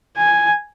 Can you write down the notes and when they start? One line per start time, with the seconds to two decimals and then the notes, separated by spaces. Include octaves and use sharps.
0.17 G#5